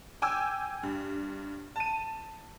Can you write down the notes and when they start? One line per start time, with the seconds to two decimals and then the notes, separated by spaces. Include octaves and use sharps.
0.22 G5 G#5 D6 E6
0.83 G2
1.76 A5 D#7